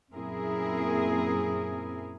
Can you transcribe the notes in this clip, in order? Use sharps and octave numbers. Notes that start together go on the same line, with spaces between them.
F#2 A#2 C4 E4 G#4 A#4